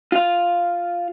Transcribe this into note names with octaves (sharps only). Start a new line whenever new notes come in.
F4 F5